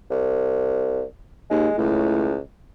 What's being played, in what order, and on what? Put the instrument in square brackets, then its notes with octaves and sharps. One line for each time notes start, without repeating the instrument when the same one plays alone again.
[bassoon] C2
[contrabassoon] D#2 [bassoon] G#3
[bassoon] C#2 [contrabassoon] A2